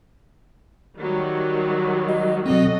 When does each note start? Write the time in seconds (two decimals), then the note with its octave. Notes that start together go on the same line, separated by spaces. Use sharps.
0.99 D#3 F#3 G3
2.08 D#5
2.46 B2 F#3 C4 F#4 A4 D#5